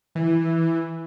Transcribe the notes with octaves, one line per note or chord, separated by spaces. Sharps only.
E3